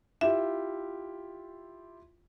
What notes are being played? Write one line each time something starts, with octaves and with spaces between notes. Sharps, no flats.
E4 F4 G4 E5